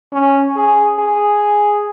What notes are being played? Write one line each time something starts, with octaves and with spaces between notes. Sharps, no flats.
C#4
G#4
G#4